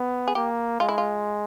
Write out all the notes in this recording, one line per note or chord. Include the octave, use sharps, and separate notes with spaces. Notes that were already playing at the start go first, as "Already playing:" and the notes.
Already playing: B3
G#4
A#3 G4
G#3 F4
E4
F4